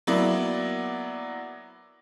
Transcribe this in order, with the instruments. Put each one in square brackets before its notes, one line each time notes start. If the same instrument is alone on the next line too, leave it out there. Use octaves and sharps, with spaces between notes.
[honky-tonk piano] F#3 A#3 B3 E4 D5